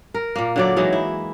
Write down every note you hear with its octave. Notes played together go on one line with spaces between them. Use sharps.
A#4
A#2 A#3
D3 F#3 D5
E3 F#3 G#3 D#4
E4